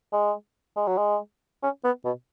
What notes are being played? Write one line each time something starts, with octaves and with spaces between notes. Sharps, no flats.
G#3
G#3
F#3
G#3
C#4
B3
B2